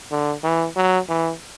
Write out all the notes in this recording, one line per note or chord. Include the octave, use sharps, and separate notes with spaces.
D3
E3
F#3
E3